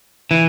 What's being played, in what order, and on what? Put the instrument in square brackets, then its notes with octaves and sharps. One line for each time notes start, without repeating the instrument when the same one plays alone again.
[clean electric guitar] E3